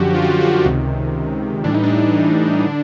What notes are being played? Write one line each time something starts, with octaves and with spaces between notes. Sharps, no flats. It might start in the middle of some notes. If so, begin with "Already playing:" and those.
Already playing: F#2 D3 F3 F#4 G4
F4
F#4
F4
F#4
C#2 C3 D#3
A2 E3 G3 D4
D#4
D4
D3